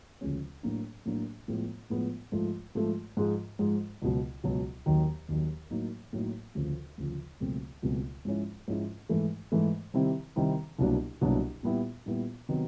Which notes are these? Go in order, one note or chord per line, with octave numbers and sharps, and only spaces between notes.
D2 C#3 F3 G#3 C#4
A2 F#3 A#3 D4
A2 F#3 A#3 D4
A2 F3 G#3 B3
A2 F3 G#3 B3
G#2 F3 A3
G#2 F3 A3
G#2 F3 G#3
G#2 F3 G#3
C#2 B2 F#3
C#2 B2 F#3
D#2 D#3 F#3
D#2 D#3 F#3
A2 F#3 A#3 D#4
A2 F#3 A#3 D#4
D2 C#3 F3
D2 C#3 F3
C#2 B2 F#3 A3 C4
C#2 B2 F#3 A3 C4
G#2 F3 G#3 C#4 E4
G#2 F3 G#3 C#4 E4
G#2 E3 A3
G#2 E3 A3
C3 D#3 G3 C4 E4
C3 D#3 G3 C4 E4
C2 B2 F#3 A#3 D4
C2 B2 F#3 A#3 D4
A#2 G3 B3 E4
A#2 G3 B3 E4
C3 D#3 F#3 B3